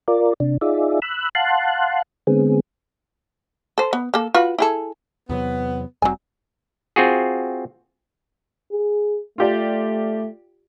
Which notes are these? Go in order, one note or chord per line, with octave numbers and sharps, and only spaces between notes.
F4 A#4 D5
C3 D4
D#4 F4 G#4 D5 E5
B5 E6 F#6
F5 F#5 A5 C6 F#6
D3 G#3 B3 C4 G#4
A4 C5
B3
A#3 A4
F4 F#4 B4
E4 G#4 A4
E2 C3 F#3 B3
F1 F#3 G3 C4 G#5
C4 F4 F#4 G#4
G#4
A3 F4 G4 D5